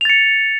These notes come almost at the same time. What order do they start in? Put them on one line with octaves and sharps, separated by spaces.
F7 A6 C#7